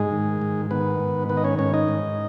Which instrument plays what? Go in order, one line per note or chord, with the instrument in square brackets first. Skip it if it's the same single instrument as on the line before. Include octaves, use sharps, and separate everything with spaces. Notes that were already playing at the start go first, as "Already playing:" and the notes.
Already playing: [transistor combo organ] G#2 G#3 G#4
D#3
G#2
D#3 B3 B4
G#2
D#3 B3 B4
D#5
C#4 C#5
G#2 C#4 C#5
D#4 D#5
G#2